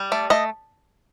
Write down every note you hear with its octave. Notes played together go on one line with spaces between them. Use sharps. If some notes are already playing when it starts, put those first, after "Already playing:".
Already playing: G3
A3 D5
A3 D#5